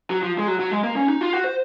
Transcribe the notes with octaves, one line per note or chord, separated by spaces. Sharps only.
F#3
F3
G#3
F#3
F#3
G#3
A#3
C#4
D#4
F4
F#4
C5